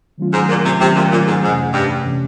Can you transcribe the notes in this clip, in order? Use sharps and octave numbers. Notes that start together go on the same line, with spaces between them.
D#3 F#3 A3 C#4 F4
G#2
A#2
C3
C3 D#3 F#3 A3 C#4 F4
A#2
A#2
G#2
F2 G#2 C3 E3 A3 C#4
G2
C3 E3 A3 C#4